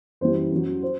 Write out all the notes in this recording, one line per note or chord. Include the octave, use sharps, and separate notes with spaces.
F#2 E3 G3 C5
F#2 F#3
C5